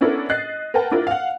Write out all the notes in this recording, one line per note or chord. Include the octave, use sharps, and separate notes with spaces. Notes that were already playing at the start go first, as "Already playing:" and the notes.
B3 C#4 D4 E4 A4 A#4
D#5 F#6 A6 C7
A#4 B4 F#5 G5 A5
D4 E4 F4 A#4
F5 F#5